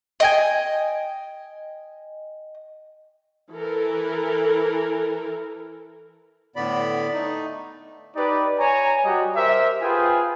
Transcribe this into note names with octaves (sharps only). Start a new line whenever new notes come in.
D#5 G5 G#5
E3 A4 A#4
A2 D3 B3 D5 B5
A3 D#4
D#4 G4 B4 D5
C#5 G#5 A#5
G3 F#4 G4 D#5
G4 A#4 C5 E5
F4 G#4 B4 C5 G5 G#5